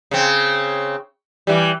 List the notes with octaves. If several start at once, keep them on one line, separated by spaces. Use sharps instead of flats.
C#3 C4
E3 G3